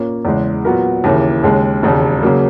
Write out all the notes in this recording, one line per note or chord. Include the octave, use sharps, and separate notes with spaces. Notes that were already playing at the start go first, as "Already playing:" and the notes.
Already playing: A#2 A#3 C#4
E2 C#3 G#3
A#2 F#3 B3 F#4 A#4
D#2 C#3 E3 A#3
D#2 C#3 G#3
E1 D#2 C#3
C#3 F#3 A#3